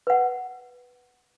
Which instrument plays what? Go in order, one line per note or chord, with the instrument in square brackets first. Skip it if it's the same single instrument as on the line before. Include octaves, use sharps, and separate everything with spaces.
[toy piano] B4 F#5